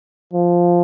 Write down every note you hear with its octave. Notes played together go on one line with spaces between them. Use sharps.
F3